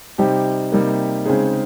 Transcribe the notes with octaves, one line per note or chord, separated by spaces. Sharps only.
C3 G3 C4 D#4 G4
C3 G3 A#3 D#4
C#3 G#3 C4 D#4 G#4